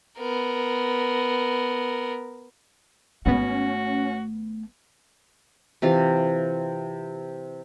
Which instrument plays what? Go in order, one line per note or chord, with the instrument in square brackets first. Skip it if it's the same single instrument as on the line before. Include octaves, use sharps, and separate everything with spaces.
[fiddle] B3 A#4
[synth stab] G#1 B3 [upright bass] A3 [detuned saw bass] C#4 [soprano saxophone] F#4
[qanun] C3 E3 F4 F5